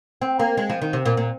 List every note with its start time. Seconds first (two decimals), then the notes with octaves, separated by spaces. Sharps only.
0.21 C4
0.40 A#3
0.57 G#3
0.70 F3
0.82 D#3
0.93 C3
1.05 A#2
1.17 A#2